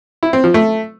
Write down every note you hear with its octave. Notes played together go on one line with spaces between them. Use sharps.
E4
C4
F3
A3